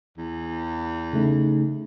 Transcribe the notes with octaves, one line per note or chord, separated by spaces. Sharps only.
E2
C#3 A3 D#4